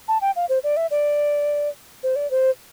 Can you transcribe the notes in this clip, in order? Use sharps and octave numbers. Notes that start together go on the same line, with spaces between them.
A5
G5
F5
C5
D5
E5
D5
C5
D5
C5